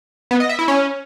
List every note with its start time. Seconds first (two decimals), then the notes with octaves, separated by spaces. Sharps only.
0.31 B3
0.40 D#5
0.49 E5
0.59 E4
0.68 C#4